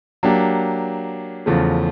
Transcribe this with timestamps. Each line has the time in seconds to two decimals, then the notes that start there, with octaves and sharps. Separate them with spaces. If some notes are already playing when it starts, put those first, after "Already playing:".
0.23 F#3 A#3 D4 G4
1.46 E2 C#3 F3 A3